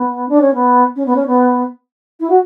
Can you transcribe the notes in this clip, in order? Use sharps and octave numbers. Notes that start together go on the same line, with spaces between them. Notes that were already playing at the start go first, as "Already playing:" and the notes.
Already playing: B3
D4
C#4
B3
C#4
B3
C#4
B3
E4
F#4